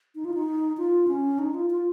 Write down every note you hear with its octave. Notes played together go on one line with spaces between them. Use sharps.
D#4
F4
D#4
F4
C#4
D#4
F4
F4